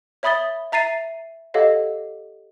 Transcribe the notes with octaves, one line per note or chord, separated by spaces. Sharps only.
C#5 E5 B5 D#6 A6 G7
E5 A#5 A6 C7 D#7
G4 A4 C#5 D#5 F5 F#5